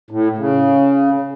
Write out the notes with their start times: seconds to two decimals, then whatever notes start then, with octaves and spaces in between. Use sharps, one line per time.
0.11 A2
0.37 C#3